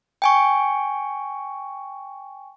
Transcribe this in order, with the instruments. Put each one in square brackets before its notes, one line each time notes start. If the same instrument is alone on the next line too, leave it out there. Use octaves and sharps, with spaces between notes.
[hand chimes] G5 G#5 C#6